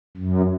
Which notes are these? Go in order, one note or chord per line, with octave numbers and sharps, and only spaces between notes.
F#2